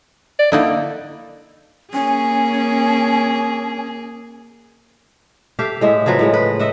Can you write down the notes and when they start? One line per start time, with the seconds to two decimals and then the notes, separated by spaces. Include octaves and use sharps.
0.39 D5
0.52 D3 A#3 D#4 E4
1.93 A#3 C#4 G#4 G#5
5.59 G4 A4 E5 F5
5.81 A2 G#3 A4 E5
6.06 C#3 F3 F#3 B4
6.19 A2 C#3 G#3
6.34 B4
6.59 D#5 E5 F#5